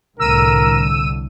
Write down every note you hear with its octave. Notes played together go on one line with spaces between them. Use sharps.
C2 A2 D3 A#4 E6 D#7